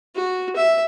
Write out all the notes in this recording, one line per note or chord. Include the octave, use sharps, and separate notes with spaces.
F#4
E5